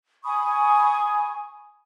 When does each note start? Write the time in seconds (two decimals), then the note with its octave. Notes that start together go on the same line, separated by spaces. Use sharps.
0.24 G#5 B5 C#6 D#6